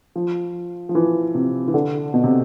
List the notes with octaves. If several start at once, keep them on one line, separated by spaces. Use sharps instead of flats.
F3
F3
E3
C3
E3
D3
B2
C3